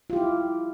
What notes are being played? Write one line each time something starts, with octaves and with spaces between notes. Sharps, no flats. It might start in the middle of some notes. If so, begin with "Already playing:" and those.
E4 F4 G4